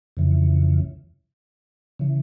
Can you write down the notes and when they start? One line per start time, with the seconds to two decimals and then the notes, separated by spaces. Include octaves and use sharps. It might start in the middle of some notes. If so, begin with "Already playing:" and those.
0.17 F2 C#3 E3
1.99 C#3 E3